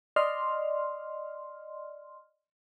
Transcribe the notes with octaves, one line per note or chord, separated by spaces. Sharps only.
D5 D#5 C6 F6